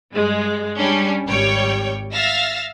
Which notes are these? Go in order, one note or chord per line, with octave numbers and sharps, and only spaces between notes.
G2 G#3
G3 C#4 D4
G#1 G3 C#5 G5
E5 F5 E6 A6 A#6